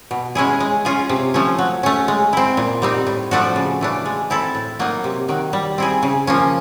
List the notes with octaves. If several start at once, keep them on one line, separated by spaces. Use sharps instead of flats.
B2
G#3 C#4 E4 G#4
G#3
C#4 F4 G#4
C3
F3 A3 C#4
F#3
A3 C#4
G#3
C4 E4
A#2
G3 C4 D#4
A2
F3 A3 D4 F#4
C#3
E3 A3 D4
G#3
C4 E4 A4
A2
F#3 A#3 D#4
C3
D#3 F#3
G3
C4 E4 G#4
C#3
F3 A#3 C#4